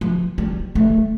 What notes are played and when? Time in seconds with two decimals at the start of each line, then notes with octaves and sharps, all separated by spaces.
0.01 F3
0.38 G3
0.75 A3